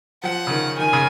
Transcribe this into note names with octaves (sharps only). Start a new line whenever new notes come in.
F3 F#5
C#3
D#3
D#3 G#5
C#3